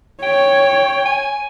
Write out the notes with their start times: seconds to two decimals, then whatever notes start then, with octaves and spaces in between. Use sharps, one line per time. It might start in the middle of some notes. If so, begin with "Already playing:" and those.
0.23 C#5 G5
1.06 G#5